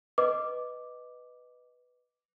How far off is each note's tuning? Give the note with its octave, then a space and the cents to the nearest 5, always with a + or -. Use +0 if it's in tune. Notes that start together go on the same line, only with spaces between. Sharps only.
B4 +0 D#5 +0 D6 +0